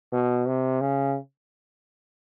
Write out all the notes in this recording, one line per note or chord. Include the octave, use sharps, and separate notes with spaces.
B2
C3
C#3